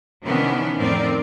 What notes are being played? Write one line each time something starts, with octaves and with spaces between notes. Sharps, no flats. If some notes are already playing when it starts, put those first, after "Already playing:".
C3 D#3 E3 B3 C#4 D4
F2 A2 D#3 C4 A#4 D5